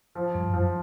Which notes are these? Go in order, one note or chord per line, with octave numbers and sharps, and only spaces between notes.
F3
G2
F#2 F3